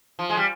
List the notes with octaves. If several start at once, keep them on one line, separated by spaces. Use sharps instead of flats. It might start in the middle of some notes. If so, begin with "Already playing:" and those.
F3
G#3
G3